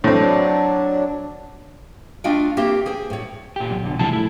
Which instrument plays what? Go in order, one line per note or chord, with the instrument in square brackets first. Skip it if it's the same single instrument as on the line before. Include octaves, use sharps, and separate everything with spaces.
[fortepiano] A2 C4 [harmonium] F#3 D4
[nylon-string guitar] A3 D4 F4 D#5 F5 G5
A#3 C4 G4 C5 E5
G#4 C5 G5
A2 C#5
[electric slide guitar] A#2 G4
[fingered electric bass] B1
[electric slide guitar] F#2 D3
[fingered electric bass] F#1 C3 F3 [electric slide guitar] G#3 E4 A5
[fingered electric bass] A#1 A3 [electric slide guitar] E4